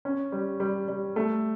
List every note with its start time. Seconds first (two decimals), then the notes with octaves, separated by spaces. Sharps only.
0.05 C#4
0.32 G3
0.60 G3
0.88 G3
1.16 A3